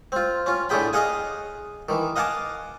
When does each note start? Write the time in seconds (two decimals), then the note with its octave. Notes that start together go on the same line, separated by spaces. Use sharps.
0.12 C4 F4
0.46 C#4 F4
0.69 A2 D3 A3 G#4 G5 B5
0.93 G#4 D#5 F5 F#5 G#5
1.89 D#3 E3
2.16 D#5 F5 F#5 G#5 A5 D6